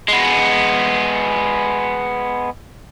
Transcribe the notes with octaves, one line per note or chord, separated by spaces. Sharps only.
G#3 B3